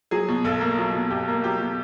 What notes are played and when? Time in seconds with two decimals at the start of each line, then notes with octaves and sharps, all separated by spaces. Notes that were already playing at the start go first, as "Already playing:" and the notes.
0.11 F#3 G#4
0.28 B2
0.44 B1 A4
0.61 A#3
0.78 F#3
0.94 B2
1.10 B1 G4
1.28 A#3
1.44 F#3 G4
1.60 B2